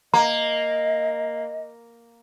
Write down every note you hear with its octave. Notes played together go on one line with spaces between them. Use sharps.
A#3 D#5 A#5